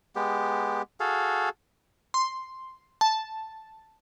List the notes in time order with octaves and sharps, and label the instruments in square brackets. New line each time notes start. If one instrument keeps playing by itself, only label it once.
[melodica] G#3 B3 G4
F#4 G#4 A4 F5
[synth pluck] C6
A5